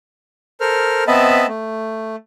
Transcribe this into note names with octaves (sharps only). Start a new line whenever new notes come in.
A4 A#4 C5 F6
B3 C4 D#5 E5 A5 B5
A3